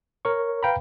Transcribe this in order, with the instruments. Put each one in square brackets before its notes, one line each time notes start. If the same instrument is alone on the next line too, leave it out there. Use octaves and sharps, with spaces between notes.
[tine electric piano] A#4 C#5 C#6
B4 F5 G5 A#5 B5